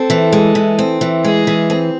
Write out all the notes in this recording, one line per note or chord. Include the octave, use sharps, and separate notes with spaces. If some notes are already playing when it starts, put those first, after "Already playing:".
Already playing: C4 A4
E3
G#3
E3
C4
E3
G#3 G#4
E3
C4